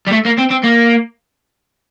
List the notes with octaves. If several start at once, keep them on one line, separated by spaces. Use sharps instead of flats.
G3
A3
A#3
C4
C4
A#3